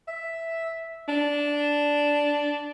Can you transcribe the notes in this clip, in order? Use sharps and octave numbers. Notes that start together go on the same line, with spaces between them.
E5
D4